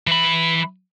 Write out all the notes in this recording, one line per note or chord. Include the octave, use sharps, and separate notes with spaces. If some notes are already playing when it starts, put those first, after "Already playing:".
E3 B5